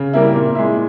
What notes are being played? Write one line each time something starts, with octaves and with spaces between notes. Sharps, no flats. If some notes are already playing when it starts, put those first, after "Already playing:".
Already playing: C#3
G3 A#3 E4
A#2
G#3 E4